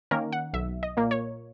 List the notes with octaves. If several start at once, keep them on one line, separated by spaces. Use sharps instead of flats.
D#3 A#3 C#4 A#4
F#5
B1 E5
D#5
A#2 A#3
C#5